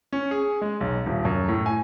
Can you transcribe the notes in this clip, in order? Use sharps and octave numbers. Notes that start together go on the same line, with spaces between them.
C#4
G#4
G#3
B1
D#1
F#2
A2
G#5